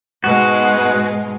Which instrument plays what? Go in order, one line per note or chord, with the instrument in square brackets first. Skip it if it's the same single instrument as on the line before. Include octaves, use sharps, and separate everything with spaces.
[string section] G#2 B2 G#3 [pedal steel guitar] F#4